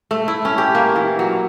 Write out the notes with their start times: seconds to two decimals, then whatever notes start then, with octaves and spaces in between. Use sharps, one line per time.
0.11 A3
0.28 E4
0.45 C#4
0.58 G4
0.75 A#3
0.96 E3
1.19 F#3